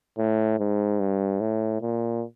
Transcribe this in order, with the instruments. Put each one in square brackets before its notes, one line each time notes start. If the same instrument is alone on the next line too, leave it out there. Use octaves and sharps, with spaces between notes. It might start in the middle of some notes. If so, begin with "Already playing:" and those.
[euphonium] A2
G#2
G2
A2
A#2